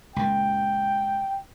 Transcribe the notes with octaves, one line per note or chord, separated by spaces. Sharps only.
C#2 A#2 G5